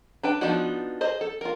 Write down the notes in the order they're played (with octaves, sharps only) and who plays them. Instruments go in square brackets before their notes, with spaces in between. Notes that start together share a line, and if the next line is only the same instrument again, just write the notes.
[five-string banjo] D4 B4 G5
F3 B3 D4 D#4 F#4
G#4 C5 D#5
A4
F4 A#4